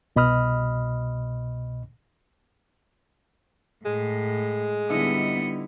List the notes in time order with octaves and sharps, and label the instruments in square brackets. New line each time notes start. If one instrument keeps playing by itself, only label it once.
[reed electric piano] C2 B2 D#5 B5 D#6 F6
[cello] A2 [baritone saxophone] G#3
[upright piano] D3 D#4 E4 [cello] G3 B3 [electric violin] D#5 C#7